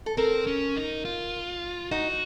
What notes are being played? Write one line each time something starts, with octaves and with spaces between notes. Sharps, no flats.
A4
C4 A#4
C#4
D#4
F4
D#4 F#4